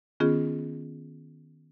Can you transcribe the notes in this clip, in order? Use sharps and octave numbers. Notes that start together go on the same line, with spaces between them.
D#3 B3 C#4 F4 G#4